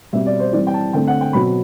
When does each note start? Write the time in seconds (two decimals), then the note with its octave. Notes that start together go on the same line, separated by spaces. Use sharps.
0.13 B2 G3 C4 E5
0.26 D5
0.40 C5
0.53 E3 G3 C4 D5
0.67 G5
0.74 A5
0.93 D3 A3 C4 G5
1.07 F#5
1.21 G5
1.33 B2 F#3 C4 B5